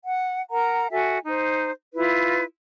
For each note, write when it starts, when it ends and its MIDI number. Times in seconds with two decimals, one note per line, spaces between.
0.04 0.40 78
0.51 0.87 70
0.51 0.87 78
0.51 0.87 82
0.91 1.18 66
0.91 1.18 69
0.91 1.18 76
0.91 1.18 80
1.26 1.70 63
1.26 1.70 72
1.95 2.43 64
1.95 2.43 65
1.95 2.43 71